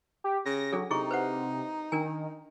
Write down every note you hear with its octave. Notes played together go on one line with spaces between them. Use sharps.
G4
C#3 A#6
F#3 D4 G#4 A4
C3 D#4 E4 G#4 C#6
B4 C5 F#5
D#3 D4 A#4 G#5